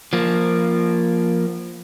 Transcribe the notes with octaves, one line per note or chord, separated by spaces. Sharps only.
F3 A#3